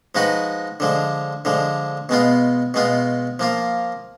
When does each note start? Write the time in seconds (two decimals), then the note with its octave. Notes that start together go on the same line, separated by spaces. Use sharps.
0.15 F3 G#3 D#4 F#4 B4
0.80 D3 F3 G#3
1.45 D3 F3 G#3
2.09 B2 G#3 B3 F4
2.74 B2 G#3 B3 F4
3.39 F3 A#3 F4